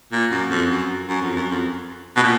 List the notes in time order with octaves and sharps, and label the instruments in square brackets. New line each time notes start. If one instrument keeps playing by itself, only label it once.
[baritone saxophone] A#2
F#2
F2
F#2
F#2
F2
F#2
F2
B2
A#2